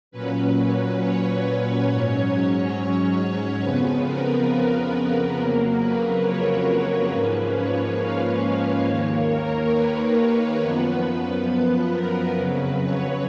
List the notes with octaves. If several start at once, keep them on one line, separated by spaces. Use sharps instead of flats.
A#2 F#3 C#4 B4
C#5
G#2 F#3 C#4
C#5
F2 C#3 F3 B3 B4
A#4
A#4
F2 C#3 F#3 A#3
B4
C#5
B4
G#2 F3 A#3 C#4
C#5
F5
C#5
D#2 D#3 A#3
A#4
B4
F#2 F3 B3
B4
A#4
F2 C#3 F#3 B4
C#5